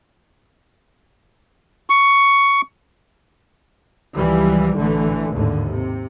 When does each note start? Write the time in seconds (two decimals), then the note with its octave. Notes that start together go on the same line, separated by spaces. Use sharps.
1.90 C#6
4.15 C#2 E3 F3 G3
4.75 A1 D3 E3 A3
5.31 G#1 D#2 A2 D3
5.70 C3